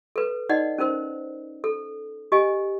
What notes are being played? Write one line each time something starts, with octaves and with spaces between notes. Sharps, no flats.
A4 B4
D#4 D5 D#5 F#5
C#4 D#4 A#4 C5
A4
G4 D#5 G#5